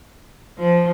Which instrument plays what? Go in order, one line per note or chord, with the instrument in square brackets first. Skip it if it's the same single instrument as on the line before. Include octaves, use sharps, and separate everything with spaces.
[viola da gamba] F3